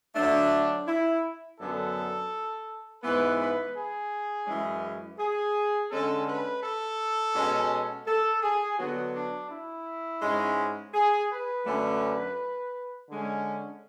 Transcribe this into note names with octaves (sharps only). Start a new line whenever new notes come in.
D3 F#3 A3 D4
E4
F#2 D3 F#3 B3 A4
G#2 E3 B3 B4
B4
G#4
F#2 E3 G#3 C#4
G#4
D3 G#3 C#4 A4
B4
A4
B2 G#3 C#4
A4
G#4
D3 F#3 B3 F#4
D4
E4
G#2 G#3 C#4
G#4
B4
F#2 D3 A3 C#4
D3 G#3 C#4